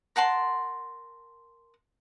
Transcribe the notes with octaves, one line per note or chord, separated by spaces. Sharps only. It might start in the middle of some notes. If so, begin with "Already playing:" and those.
A#4 F#5 A5 C6